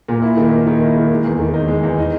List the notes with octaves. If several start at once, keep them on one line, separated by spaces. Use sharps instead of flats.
A#2
E4
D#3
A#3
D#3
E4
D#3
G#3
E2
D#3
D#4
G#3
E2
D#4